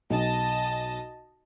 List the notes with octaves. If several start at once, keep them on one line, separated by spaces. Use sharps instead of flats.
B1 D#5 A5